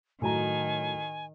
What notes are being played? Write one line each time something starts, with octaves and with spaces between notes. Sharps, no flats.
A2 D#3 F#3 G#5 A#5